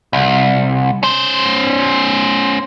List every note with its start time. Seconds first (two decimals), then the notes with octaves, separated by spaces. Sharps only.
0.13 C2
1.03 C#4 C5